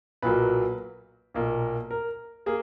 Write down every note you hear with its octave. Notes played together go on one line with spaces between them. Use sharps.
B1 A#2 F#3 A#3 B4
B1 A#2 A#3
A#4
A#3 G#4